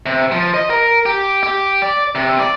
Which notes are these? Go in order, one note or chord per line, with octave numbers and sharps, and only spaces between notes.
C3
F3
D#5
A#4
G4
G4
D5
C3
D5